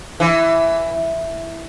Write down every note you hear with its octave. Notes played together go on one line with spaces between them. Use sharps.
E3